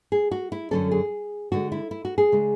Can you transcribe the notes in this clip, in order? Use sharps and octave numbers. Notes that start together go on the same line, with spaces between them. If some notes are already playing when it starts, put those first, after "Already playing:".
G#4
F#4
E4
F#2 D3 F#3 C#4 A4
G#4
D3 G#3 D4 F#4
E4
E4
F#4
G#4
C#3 G#3 D4